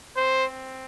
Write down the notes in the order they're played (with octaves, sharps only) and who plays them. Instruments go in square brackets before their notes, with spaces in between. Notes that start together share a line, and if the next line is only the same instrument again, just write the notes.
[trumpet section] C4 C5